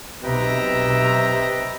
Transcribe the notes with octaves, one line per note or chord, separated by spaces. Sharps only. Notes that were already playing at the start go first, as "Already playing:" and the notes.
B1 C3 B4 D#5 E5 G5 A#5